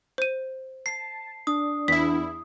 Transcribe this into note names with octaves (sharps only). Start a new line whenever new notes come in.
C5 D#7
A5 C7
D4 D#6
E2 E4 B6